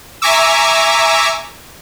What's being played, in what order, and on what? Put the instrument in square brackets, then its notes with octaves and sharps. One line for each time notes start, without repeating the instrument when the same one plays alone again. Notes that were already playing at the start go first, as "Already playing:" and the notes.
[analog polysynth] E5 G#5 A#5 C#6 D6 E6